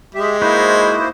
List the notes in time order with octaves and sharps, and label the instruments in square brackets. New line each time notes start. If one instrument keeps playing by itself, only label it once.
[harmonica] G#3 [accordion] G4 E5
[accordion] A#3 E4 C5 [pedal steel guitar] D#4 F#4 B4